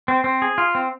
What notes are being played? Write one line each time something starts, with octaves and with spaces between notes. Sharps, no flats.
C4
C4
G#4
F4
C4